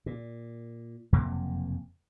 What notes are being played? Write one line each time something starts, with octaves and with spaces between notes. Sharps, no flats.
A#2
F#1 F2 C3 A#3